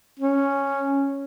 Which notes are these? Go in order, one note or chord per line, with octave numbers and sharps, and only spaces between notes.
C#4